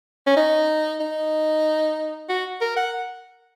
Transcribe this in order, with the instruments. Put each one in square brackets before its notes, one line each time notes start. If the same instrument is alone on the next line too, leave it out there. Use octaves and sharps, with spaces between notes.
[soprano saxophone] C#4
D#4
D#4
F#4
A#4
F#5